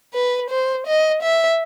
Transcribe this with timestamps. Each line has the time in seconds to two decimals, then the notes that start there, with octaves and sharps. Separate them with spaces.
0.14 B4
0.50 C5
0.87 D#5
1.22 E5